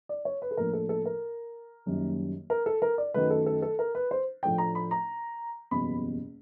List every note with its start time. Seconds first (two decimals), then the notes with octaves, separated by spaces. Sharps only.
0.09 D5
0.25 C#5
0.42 B4
0.51 A4
0.57 A2 F3 A#3 D4 A#4
0.73 A4
0.89 A4
1.06 A#4
1.86 F#1 F#2 D#3 G3 A#3
2.50 A#4
2.66 A4
2.82 A#4
2.98 D5
3.14 F#2 D#3 F#3 A3 B4
3.30 A4
3.46 A4
3.62 A4
3.79 A#4
3.95 B4
4.11 C5
4.43 A2 F3 A3 D4 G5
4.58 A#5
4.75 B5
4.91 A#5
5.71 F#1 E2 B2 G3 B5